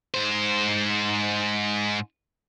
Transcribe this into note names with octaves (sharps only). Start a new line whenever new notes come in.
G#2 C5